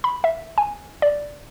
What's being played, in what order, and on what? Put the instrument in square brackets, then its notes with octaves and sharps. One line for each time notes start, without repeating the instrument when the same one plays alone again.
[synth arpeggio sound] B5
E5
G#5
D5